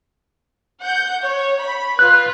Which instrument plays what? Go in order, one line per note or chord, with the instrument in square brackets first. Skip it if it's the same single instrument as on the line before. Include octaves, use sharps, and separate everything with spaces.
[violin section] F#5 G6
C#5
B5
[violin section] F4 B4 [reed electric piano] F#6